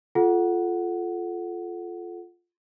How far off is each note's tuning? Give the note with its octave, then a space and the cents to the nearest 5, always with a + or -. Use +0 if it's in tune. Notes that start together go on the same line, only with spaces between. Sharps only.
F4 +0 A4 -20 F#5 +0